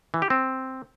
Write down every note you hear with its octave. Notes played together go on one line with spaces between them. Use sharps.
E3
G4
C4